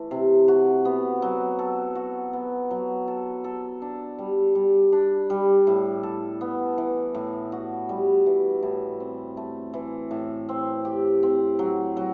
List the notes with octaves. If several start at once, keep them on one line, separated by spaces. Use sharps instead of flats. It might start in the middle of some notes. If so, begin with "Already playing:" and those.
Already playing: E3 A3
C3
F#4
B3
F#3
A4
F#4
B3
F#3
A4
A4
D4
G3
G3
D4
G3
A2
A4
B3
E3
A2
F#4
G3
E3
A2
C4
A3
E3
A2
C4
G4
C4
F#3
F#3